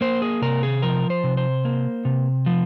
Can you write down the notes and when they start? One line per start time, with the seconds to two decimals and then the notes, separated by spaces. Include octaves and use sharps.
0.01 A#3 C5
0.22 G#4
0.42 C3 A#4
0.63 G#4
0.82 F3 A#4
1.10 C5
1.24 C3
1.37 C5
1.65 A#3
2.05 C3
2.46 F3